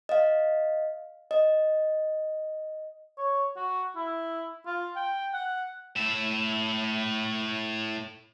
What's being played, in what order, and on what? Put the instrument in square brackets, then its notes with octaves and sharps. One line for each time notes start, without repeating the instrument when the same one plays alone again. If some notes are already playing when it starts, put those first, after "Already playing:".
[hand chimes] D#5 F5
D#5
[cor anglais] C#5
F#4
E4
F4
G5
F#5
[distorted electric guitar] A2 E5